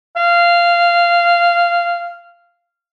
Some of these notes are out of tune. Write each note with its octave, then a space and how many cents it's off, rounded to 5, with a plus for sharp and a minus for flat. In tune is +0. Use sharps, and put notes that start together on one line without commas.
F5 -15